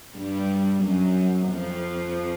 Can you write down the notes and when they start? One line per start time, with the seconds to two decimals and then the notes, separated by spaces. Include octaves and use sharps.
0.16 G2 G3
0.83 F#2 F#3
1.49 F2 F3